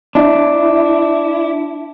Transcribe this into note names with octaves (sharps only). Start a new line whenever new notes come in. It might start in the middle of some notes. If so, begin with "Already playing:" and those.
D4 E4